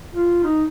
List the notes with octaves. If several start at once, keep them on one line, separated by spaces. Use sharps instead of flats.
F4
D#4